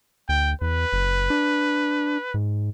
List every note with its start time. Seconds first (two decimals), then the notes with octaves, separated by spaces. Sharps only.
0.29 D2 G5
0.61 E2 B4
0.92 F#1
1.30 D4
2.34 G#2